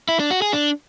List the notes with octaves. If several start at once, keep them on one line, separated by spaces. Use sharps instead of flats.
E4
D4
F#4
G#4
D4